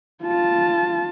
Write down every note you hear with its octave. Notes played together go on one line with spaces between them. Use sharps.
F4 A5